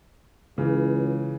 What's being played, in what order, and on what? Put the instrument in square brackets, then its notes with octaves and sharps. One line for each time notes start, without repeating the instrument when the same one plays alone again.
[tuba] C#2 [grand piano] C#3 E3